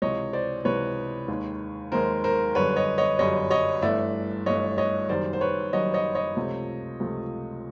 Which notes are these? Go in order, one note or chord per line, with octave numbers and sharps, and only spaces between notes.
C#2 C3 E3 C#5 D#5
C5 D5
C#2 C3 E3 B4 C#5
D#2 D#3 G#3
D#2 D#3 G#3 A#4 C5
A#4 C5
G1 F#2 D3 G3 B4 C#5
C#5 D#5
C#5 D#5
G1 F#2 D3 G3 C#5 D#5
C#5 D#5
G1 G2 E3 A3 D5 E5
G1 G2 E3 A3 C#5 D#5
C#5 D#5
F#1 F#2 D#3 G3 C5 D5
C5
B4 C#5
F#1 F#2 D#3 G3 C#5 D#5
C#5 D#5
C#5 D#5
C#2 C3 F3 A3
C#2 C3 F3 A3